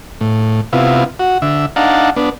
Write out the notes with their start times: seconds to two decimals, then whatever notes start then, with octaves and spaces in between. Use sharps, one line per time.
0.21 A2
0.73 C3 B3 E4 F4
1.19 F#4
1.42 D3 E5
1.76 D4 D#4 F5 F#5 A5 A#5
2.16 B3 D4